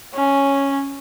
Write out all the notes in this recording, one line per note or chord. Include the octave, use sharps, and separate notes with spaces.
C#4